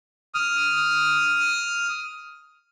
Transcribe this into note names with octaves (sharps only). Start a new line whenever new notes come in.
D#6 F6